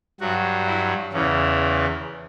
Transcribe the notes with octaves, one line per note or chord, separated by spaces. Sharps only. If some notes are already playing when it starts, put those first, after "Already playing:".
G2 F#3 F#4
E4
E2 C#3 E3 C#4